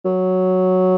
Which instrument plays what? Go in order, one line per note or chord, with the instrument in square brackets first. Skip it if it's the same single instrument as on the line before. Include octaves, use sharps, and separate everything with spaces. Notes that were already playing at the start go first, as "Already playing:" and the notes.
[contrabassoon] F#3